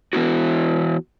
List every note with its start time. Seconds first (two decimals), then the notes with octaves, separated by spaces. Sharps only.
0.13 E3 B3 E4 F#4